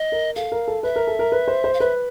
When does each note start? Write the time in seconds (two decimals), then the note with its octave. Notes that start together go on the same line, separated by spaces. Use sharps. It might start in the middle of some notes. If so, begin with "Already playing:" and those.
Already playing: D#5
0.12 A#4
0.36 A4 F5
0.52 A#4
0.68 A4
0.83 B4 E5
0.96 A#4
1.07 A4
1.19 A#4
1.32 B4
1.48 C5
1.64 C5
1.74 F5
1.80 B4 E5